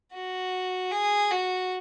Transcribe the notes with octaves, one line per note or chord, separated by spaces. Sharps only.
F#4
G#4
F#4